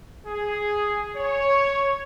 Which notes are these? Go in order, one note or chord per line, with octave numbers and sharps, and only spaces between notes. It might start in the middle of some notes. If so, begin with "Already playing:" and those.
G#4
C#5